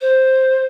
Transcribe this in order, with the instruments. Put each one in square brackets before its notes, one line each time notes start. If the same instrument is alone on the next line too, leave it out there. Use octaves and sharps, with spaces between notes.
[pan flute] C5